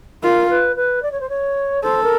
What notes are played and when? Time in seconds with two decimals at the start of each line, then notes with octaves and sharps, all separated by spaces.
0.23 F4 A#4
0.50 B4
0.76 B4
1.02 D5
1.12 C#5
1.21 C5
1.29 C#5
1.83 A4 C5
2.03 A#4